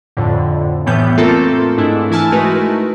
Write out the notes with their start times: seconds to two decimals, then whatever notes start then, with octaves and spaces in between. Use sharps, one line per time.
0.17 F2 A2 D3
0.86 A2 E3 G3 B3 G6
1.17 A3 A#3 C4 F4 A4 A#4
1.78 G#2 A3 D4 E4
2.11 E3 E4 G#5 A5 F6
2.32 G#3 A3 D#4 F#4 A#4 B4